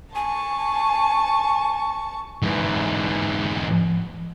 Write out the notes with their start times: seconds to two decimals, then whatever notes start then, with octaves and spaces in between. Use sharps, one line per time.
0.15 G#5 A5 C#6
2.42 G#2 E3